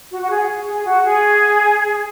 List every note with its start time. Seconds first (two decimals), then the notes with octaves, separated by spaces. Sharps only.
0.11 F#4
0.22 F#4
0.30 G#4
0.66 G#4
0.85 F#4
1.03 G#4